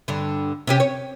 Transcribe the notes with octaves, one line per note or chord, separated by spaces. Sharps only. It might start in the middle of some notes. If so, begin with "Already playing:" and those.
G2 D3
C3 C#4 G4
C#5